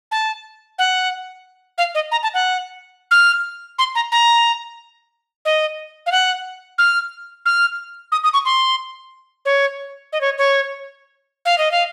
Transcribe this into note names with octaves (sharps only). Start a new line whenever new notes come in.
A5
F#5
F5
D#5
A#5
A5
F#5
F6
C6
A#5
A#5
D#5
F5
F#5
F6
F6
D#6
D#6
C#6
C6
C#5
D#5
C#5
C#5
F5
D#5
F5